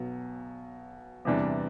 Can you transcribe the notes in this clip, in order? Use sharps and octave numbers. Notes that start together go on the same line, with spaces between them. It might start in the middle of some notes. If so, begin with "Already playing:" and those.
Already playing: B1 B2 F#3
E2 C3 E3 G3 D4